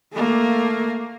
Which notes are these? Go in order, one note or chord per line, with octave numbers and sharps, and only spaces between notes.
A3 A#3